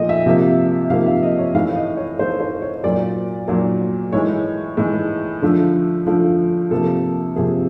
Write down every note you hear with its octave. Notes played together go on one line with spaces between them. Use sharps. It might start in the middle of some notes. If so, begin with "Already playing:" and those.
Already playing: A#2 F3 A3 D#5
E5
C3 F3 A#3
C3 F3 A#3 F5
E5
D#5
C#5
A2 E3 A3 F5
D#5
C#5
A2 E3 A3 C5
C5
C#5
A#2 F#3 A#3 D5
A#2 F#3 A#3
A2 E3 G#3 C#5
A2 E3 G#3
D3 F3 A3
D3 F3 A3
C3 F3 A#3 A4
C3 F3 A#3 G#4